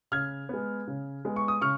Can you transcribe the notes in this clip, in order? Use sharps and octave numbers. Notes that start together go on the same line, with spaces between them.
C#3 F6 G#6
G#3 B3
C#3
G#3 B3
C#6
D#6
C#3 C#6 F6